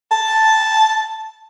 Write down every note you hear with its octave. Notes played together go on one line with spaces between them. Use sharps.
A5